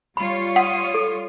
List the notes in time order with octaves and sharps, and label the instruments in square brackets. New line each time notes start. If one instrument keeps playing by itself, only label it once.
[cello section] G3 F4 C#5 [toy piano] B5
[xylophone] F#5 [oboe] D#6
[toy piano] A4